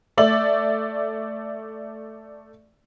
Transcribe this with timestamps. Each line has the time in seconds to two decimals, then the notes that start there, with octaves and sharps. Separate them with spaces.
0.17 A3 D5 E5 F#7